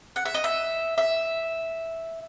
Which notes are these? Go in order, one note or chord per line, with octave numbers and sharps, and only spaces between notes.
F#5
E5
D#5
E5
E5